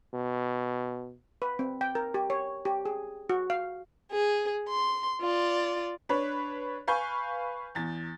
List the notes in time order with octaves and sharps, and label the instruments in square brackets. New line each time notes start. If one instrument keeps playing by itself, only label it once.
[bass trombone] B2
[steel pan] B4
C4
G5
A#4
G4
C#5
G4
G#4
F#4
F5
[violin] G#4
C6
F4 D5
[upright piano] D4 B4 C#5
B4 F5 G#5 C#6 G6
E2 A6